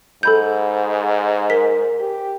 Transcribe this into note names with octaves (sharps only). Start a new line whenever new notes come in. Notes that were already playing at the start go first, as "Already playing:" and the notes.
G#2 A4 B5 G6
A#4 B6
G4